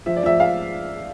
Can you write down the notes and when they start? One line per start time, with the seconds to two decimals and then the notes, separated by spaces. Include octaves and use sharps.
0.06 F3 E5
0.16 D5
0.23 F3 E5
0.40 F5